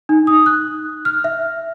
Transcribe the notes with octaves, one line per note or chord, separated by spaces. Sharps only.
D#4
D#6
F#6
F6
E5